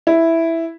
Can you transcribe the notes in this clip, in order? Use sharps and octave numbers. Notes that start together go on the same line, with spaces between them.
E4